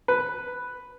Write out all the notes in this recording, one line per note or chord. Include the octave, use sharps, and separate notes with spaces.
B4